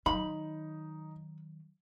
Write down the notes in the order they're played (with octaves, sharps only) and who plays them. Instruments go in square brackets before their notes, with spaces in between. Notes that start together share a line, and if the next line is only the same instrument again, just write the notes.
[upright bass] D#3 F#3 [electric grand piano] D#4 [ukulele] B5